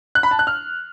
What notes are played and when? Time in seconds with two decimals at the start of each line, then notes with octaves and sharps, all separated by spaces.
0.15 F#6
0.23 B5
0.31 A5
0.39 F#6
0.47 F6